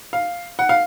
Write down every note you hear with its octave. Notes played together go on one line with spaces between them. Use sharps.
F5
F#5
F5